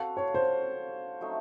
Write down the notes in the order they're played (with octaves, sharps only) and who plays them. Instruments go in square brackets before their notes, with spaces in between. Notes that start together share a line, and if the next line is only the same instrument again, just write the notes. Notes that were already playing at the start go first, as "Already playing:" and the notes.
Already playing: [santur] C4 F#4 A4 [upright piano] F5
[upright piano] C#5
C5
[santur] F#3 A3 D#4